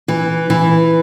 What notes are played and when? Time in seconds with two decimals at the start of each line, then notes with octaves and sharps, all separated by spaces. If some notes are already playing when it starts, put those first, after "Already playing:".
0.08 E3
0.50 E3